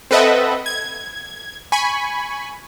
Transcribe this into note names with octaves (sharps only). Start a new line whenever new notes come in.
C4 A4 B4 D#5 E5 F#5
G#6
G#5 B5 C#6